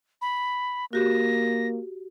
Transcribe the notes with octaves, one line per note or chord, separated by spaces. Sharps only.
B5
A#3 F#4 G4 A#6